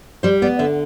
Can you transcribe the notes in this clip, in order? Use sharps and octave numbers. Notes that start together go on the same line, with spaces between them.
G3 C5
B3 D5
D3 E5